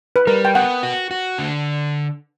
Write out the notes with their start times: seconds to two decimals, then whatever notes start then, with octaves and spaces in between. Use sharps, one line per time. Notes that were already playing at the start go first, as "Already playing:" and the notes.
0.16 B4
0.27 G3 A#4
0.45 G5
0.55 B3 F#5
0.83 F#4
1.11 F#4
1.38 D3